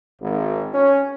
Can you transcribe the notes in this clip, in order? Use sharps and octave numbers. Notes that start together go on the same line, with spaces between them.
G#1
C#4